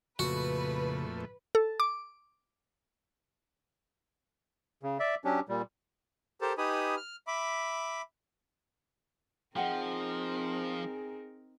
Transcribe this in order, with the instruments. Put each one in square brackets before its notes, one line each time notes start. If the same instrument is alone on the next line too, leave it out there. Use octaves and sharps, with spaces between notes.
[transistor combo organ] F2 A#2 A3 [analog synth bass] C#3 [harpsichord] F#4 [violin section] B4
[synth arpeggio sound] A4
D6
[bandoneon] C#3
D5 E5
F#3 C#4 D4 G4
A#2 G3
[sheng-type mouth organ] G4 A4 A#4 C5 A5
D#4 G4 B4 G#5 B5 D#6
F6
E5 B5 D6
[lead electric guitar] F3 [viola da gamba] C4 D#4 A#4 [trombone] G#4 [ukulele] D#5 F#5 G5